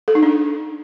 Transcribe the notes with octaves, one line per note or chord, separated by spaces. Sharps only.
A4
D#4
D4